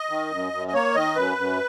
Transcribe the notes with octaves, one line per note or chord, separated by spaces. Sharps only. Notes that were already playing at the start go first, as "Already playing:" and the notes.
Already playing: D#5
D#3
F#2
F#2
D#5
A#3 C#5
D#3 D#5
F#2 B4
F#2